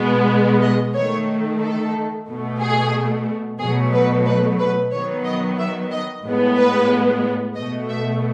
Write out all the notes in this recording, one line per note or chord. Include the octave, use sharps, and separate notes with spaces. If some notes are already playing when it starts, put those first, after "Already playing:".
Already playing: B2 G#3 B3
D#5
D#3 A3 C#5
A4
B2 A3
G#4
B2 F#3 A3 G#4
B4
B4
B4
D#3 F#3 B3 C#5
D#5
E5
D#5
A2 G#3 B3
B4
B2 A3 D#5
E5